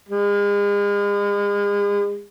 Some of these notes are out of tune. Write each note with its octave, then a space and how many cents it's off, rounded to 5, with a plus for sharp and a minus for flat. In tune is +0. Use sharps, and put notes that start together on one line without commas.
G#3 -40